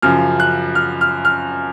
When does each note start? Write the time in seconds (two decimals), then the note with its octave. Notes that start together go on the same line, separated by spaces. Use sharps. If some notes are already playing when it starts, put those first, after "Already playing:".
0.02 F#2 C#3 F3 F6
0.40 F#6
0.75 F6
1.01 F6
1.25 F6